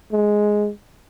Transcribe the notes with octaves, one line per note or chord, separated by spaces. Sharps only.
G#3